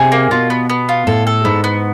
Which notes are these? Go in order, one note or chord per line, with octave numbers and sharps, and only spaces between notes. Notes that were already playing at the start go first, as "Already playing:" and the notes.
Already playing: C3 G#4
A#3
B2 F4
B3
B3
F4
A2 A4
A4
G#2 B3
B3